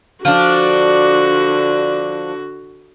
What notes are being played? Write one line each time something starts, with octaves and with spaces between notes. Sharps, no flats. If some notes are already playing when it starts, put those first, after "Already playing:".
D3 F3 D4 F#4